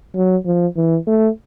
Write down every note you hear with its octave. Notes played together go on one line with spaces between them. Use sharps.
F#3
F3
E3
A3